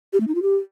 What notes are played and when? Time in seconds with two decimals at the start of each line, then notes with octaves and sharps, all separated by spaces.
0.13 G4
0.20 A3
0.28 D#4
0.35 F4
0.42 G4